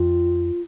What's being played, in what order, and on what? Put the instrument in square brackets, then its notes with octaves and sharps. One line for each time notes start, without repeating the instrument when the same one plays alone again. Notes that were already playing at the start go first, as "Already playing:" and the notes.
Already playing: [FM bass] F2 [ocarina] F4